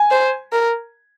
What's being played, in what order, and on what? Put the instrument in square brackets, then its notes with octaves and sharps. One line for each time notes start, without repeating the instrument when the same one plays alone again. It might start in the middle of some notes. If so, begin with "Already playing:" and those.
Already playing: [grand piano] G#5
[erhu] C5
A#4